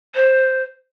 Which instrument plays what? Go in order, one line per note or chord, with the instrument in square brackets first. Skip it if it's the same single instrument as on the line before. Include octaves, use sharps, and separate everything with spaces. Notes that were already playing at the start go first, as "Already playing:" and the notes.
[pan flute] C5